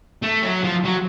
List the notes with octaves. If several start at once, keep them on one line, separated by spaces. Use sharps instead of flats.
A3
F#3
F3
F#3